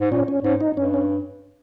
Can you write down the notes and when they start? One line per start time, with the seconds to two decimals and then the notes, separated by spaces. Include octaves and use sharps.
0.01 G#2
0.11 A#2 C#4
0.28 C#4
0.44 G#2 C#4
0.61 D#4
0.77 G2 C#4
0.94 C#4